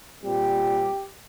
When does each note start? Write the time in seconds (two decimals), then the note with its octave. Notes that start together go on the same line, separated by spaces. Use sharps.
0.22 A#2 G3 C4 G4